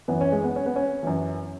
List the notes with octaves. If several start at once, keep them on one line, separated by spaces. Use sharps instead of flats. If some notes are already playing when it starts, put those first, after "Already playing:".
F#2 E3 B3
C#4
G#3
B3
C#4
B3
C#4
F#2 E3